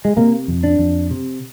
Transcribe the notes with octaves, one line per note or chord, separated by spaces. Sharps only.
G#3
C3 A#3
F2
D4
F2
C3